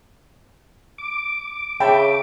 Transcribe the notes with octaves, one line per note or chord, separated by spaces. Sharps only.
D6
C#3 E5 G5 A5 B5